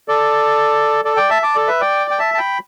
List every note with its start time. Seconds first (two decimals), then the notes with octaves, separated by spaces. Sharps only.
0.08 A4 D5
1.05 A4 D5
1.17 D5 G5
1.30 E5 A5
1.42 A5 D6
1.55 A4 D5
1.68 B4 E5
1.80 D5 G5
2.11 G5
2.19 E5 A5
2.34 A5
2.38 G5 B5